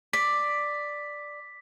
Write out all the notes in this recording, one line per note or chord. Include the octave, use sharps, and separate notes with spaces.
D5 B6